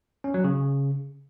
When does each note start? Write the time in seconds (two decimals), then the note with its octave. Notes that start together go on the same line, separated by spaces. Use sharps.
0.24 C#4
0.34 F#3
0.44 C#3